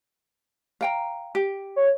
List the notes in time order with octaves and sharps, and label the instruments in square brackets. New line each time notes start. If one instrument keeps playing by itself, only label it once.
[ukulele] F5 G5 A#5
G4
[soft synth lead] C#5